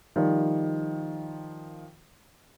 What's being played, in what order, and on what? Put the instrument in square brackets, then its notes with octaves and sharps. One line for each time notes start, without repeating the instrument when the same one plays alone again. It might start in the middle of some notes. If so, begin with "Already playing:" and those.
[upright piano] D#3 F3 G3